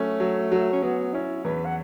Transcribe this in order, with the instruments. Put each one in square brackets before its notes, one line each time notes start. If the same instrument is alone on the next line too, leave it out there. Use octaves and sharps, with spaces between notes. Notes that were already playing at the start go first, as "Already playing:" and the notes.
Already playing: [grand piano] F#3 C#4 [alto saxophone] A3
[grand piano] F#3
F#3
[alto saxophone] C#4
[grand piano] F#3 [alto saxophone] B3
[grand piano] C#4 [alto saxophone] E4
[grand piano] E2 [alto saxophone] B4
[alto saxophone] F#5